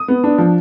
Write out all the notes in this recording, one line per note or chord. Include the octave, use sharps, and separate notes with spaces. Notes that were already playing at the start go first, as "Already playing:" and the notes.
Already playing: D#6
B3
D4
F3